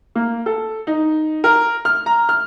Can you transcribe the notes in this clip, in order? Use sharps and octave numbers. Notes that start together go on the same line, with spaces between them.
A#3
A4
D#4
A#4
F6
A#5
F6